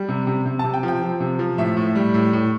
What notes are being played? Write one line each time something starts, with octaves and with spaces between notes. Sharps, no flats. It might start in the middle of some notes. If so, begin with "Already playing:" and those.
Already playing: G3
C3
C3
C3
A5
C3
G5
F3
G5
F3
C3
F3
A2 E5
A2
G3
A2
A2